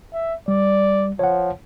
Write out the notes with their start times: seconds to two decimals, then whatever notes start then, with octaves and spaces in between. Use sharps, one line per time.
0.13 E5
0.48 G3 D5
1.19 F3 C#5 F#5